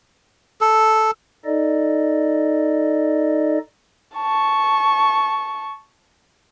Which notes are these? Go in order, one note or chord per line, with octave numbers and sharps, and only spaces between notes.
A4
D#4 A4 D5 D#5
A5 C#6